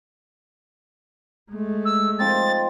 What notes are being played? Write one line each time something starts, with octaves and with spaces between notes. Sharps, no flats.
G#3 A3
E6
F3 C4 D#4 A6